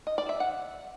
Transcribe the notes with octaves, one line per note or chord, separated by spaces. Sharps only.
D#5
D5
E5
F#5